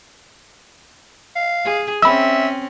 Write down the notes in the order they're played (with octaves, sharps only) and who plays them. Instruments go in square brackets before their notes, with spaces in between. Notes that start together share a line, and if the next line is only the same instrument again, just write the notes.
[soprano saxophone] F5
[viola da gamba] G#4
[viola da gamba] C4 C#4 [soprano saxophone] E5 [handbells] B5 E6